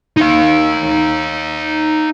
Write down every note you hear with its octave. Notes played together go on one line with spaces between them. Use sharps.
D#4 F5